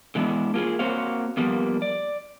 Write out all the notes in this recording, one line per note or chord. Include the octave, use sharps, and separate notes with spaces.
D3 E3 G#3 B3 D4 E4
A#3 F4 G4 G#4
A#3 C4 F#4 C5 C#5 F5
F3 G3 A#3 B3
D5